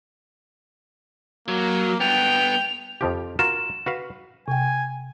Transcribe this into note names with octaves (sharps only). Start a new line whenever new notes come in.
F#3 A#3
G2 B3 G5 F7
F2 F3 G4
F4 F#4 A#4 E7
F#4 B4 F5
C3 G5 G#5